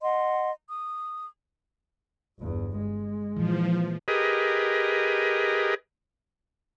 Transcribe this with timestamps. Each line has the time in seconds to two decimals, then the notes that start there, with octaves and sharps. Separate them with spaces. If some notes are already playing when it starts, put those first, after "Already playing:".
0.03 D#5 F#5 C6
0.68 D#6
2.39 G1 E2
2.76 G#3
3.37 A#2 E3 F3
4.08 G4 G#4 A#4 B4 D#5